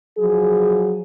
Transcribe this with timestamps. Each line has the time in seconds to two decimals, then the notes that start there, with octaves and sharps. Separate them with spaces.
0.18 F3 F#3 G#4